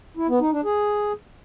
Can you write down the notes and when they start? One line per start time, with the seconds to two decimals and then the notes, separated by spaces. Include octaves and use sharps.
0.17 E4
0.29 B3
0.41 D#4
0.52 D4
0.64 G#4